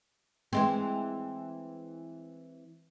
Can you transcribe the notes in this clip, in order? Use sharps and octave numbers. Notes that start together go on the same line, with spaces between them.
E3 G#3 C4